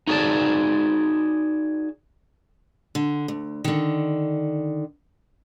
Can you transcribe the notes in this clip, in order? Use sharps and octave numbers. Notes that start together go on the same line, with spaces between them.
D#4 F#4 G#4 D5 A5
D3
D2
D3 D#3